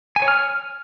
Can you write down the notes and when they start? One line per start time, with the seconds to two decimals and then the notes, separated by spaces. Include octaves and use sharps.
0.16 G#5
0.22 C#5
0.28 F6